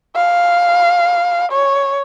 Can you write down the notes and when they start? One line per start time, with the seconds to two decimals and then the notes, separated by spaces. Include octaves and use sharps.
0.16 F5
1.52 C#5